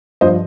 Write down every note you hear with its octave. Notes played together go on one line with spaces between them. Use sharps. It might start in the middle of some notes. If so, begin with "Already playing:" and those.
G2 F3 C5 D#5